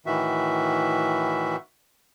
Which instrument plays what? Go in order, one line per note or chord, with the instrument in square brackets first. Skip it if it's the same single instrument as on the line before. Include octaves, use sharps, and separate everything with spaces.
[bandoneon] A2 D#3 E3 F#4 E5